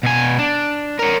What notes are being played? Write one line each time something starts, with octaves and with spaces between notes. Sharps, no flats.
B2 G#5
D4
A#4 C#5